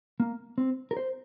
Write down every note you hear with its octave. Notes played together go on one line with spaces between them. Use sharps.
A#3
C4
A#4
C5